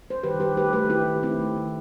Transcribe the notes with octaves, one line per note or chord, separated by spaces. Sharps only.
C5
D#3 G4 B4
D#3 G4 B4
A3 G4 B4
A3 G4 B4
D#3 E4 G4
D#3
A3 C4 E4
A3
D#3